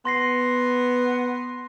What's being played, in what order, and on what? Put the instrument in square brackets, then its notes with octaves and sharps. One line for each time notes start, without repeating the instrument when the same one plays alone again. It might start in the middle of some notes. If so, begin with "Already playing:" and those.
[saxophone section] B3 [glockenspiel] C6 A#6 C7